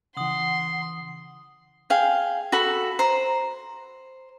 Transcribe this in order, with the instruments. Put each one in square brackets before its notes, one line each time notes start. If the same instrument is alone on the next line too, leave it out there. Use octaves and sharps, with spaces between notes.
[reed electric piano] C#3 E3 [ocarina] F#5 [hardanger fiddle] C6 [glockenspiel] D#6 F#7
[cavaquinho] G#4 F5 G5
F#4 A4 B5
C5 A#5